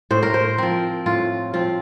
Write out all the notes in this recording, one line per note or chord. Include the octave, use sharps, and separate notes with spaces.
A2 C5
A#4
C5
F3 C4 A#4
A2 F4
F3 C4 F4